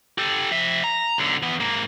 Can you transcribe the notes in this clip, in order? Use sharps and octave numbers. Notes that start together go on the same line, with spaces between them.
G4 A4
F3 E5
A#5
B1 D3
E3 B3
G#2 A#3